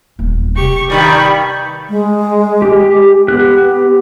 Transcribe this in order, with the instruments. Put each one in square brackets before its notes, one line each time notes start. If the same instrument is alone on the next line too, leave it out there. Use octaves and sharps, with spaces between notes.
[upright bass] D#1 B3
[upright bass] C3 [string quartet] G4 C#6
[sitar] G2 D#3 G3 [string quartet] B5 C#6
[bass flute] G#3
[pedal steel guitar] G4
[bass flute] B3 [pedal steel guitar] G4 F#6